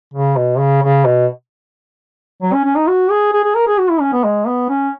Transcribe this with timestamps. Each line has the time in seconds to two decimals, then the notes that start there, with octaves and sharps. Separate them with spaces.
0.14 C#3
0.37 B2
0.59 C#3
0.83 C#3
1.06 B2
2.42 F#3
2.53 C#4
2.64 C#4
2.76 D#4
2.88 F#4
3.10 G#4
3.33 G#4
3.44 G#4
3.55 A#4
3.67 G#4
3.78 F#4
3.90 E4
4.01 C#4
4.13 B3
4.24 G#3
4.47 B3
4.69 C#4